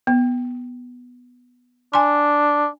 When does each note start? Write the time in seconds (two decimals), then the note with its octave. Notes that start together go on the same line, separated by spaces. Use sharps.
0.07 B3
1.94 D4 G#5 C6